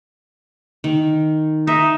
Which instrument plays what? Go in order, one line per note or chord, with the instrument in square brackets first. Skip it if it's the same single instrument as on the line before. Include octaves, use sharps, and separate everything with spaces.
[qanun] D#3
[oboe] D#4 [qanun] E5